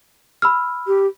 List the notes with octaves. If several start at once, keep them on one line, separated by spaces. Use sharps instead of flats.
B5 E6 F6
G4